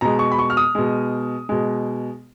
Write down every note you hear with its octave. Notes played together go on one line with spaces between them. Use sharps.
B2 G#3 A#5
C#6
B5
C#6
F6
D#6
B2 G#3
B2 G#3